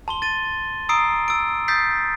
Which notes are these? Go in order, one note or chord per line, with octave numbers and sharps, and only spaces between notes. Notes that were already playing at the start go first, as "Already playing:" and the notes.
A5 C6 G7
A6 D#7
A#5 D#6 E6 C7 D7
E6 D7
D#6 E6 G6 A6 B6 C7